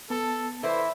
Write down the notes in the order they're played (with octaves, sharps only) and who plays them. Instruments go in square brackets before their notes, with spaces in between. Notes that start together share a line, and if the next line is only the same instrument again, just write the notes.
[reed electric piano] B3 A5 [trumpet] A4
[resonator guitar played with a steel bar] E3 E4 [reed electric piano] A4 B4 D5 [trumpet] C5 [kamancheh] E5